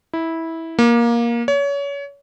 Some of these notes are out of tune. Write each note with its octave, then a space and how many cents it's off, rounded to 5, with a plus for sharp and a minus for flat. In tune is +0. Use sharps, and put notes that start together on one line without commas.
E4 -15
A#3 +15
C#5 +30